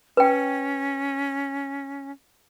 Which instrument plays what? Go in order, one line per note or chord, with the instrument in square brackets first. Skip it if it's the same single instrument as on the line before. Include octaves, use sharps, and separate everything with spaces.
[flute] C#4 [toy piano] B4 G5